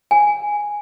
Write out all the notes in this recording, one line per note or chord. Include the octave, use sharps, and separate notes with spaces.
G#5